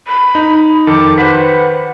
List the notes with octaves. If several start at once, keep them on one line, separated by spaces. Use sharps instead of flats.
B5
D#4
F2 D#3 A4 D6
B4 C5 F#5